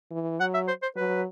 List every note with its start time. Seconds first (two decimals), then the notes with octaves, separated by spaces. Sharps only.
0.11 E3
0.40 F#3 F#5
0.54 E5
0.68 C5
0.82 C5
0.96 F#3 B4